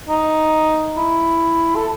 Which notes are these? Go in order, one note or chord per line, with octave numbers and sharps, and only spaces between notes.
D#4
E4
A4